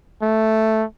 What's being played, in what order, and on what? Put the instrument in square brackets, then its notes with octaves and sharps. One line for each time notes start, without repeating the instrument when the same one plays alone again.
[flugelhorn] A3